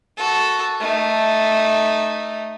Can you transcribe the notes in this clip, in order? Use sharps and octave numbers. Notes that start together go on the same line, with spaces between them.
F#4 A4
A3 D#4